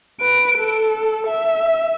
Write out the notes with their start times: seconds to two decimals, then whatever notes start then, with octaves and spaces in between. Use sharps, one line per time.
0.21 B4 D7
0.58 A4
1.27 E5